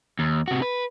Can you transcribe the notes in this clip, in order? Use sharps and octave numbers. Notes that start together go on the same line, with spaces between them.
D#2
C3 F#4
B4